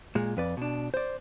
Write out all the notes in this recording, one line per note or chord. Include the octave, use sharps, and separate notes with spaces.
A#2 G#3
F2 B4 D5
B2 D4
C5 D5